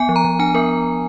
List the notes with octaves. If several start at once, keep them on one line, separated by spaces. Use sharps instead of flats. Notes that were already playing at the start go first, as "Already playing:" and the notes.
Already playing: B3 G#5
F3
A#5
F3
D4 G#5
B3 A#4